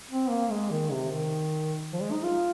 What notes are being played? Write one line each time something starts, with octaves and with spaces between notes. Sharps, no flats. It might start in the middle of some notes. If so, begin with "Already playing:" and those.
C4
A#3
G#3
D#3
C3
D#3
F3
G#3
D#4
F4